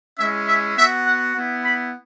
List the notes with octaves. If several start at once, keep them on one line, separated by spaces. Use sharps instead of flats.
G#3 C#4 E4 E5
E5
B3 F#4 E5
F#5
B3 E4
B5